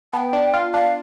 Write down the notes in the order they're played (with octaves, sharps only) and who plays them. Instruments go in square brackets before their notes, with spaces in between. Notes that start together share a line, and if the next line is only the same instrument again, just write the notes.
[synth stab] B3 [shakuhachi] G5 A5
[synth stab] D4
F4
[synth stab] D4 [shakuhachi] F5